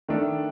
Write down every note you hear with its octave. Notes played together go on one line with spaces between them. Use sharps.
D#3 A3 D4